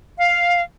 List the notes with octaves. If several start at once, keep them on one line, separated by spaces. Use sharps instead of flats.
F5